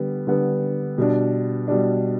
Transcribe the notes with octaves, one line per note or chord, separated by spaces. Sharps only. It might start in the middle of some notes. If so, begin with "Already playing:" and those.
Already playing: D3 G3 B3
D3 G3 B3
B2 G3 D4
B2 G3 D4